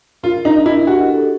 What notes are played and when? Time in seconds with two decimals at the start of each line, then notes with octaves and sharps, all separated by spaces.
0.23 F4 A#4
0.45 D4 D#4
0.65 E4 D#5
0.87 F#4 G4
1.09 A4